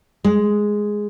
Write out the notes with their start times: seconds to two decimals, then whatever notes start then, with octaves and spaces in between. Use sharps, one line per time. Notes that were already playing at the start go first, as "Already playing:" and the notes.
0.24 G#3